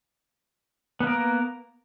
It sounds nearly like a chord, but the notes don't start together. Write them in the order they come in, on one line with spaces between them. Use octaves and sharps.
B3 A#3 A#4